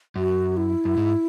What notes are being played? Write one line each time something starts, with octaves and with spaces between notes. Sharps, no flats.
F#2 F#4
E4
F#2
G#2